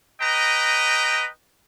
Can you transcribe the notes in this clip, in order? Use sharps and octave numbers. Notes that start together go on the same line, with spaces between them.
B4 D#5 G5 A#5